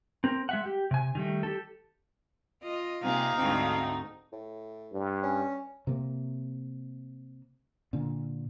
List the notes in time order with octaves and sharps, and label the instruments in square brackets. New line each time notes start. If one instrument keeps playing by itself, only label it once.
[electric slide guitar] C4 A#4
G#3 E5 F#5
G4
C3 G#5
D#3 G3 A3
G4 A4
[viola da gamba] F4 D#5
[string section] C3 A#3 G#4 [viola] D#4 [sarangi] F5
[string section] D2 G#2 A3 [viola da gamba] C4
[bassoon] A2
[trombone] G2
[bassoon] C#4
[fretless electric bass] C3 A#3
A#2 D3